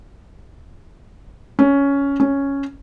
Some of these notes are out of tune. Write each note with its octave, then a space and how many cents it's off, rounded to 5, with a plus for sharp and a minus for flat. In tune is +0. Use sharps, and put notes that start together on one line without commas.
C#4 +10
C#4 +0